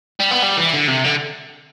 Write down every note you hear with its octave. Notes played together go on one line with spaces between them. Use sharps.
G3
B3
G3
E3
D3
C3
D3